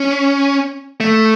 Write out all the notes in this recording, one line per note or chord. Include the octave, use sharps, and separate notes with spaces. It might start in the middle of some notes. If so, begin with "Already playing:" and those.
Already playing: C#4
A3